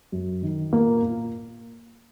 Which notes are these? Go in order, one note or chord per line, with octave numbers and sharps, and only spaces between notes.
F#2
D#3
A#2 A#3
A#2